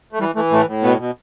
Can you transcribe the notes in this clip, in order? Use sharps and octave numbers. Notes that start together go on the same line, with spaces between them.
A3
E3 G3
E3 A3
A2 A3
A2
B2 B3
B2